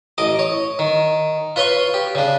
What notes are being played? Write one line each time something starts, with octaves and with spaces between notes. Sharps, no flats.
A1 D#5 D6
C#5
D#3
F4 B4 C#5 C6 C#6
G4
C#3 D4